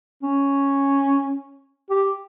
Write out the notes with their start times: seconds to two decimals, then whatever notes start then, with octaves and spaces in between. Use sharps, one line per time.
0.23 C#4
1.90 G4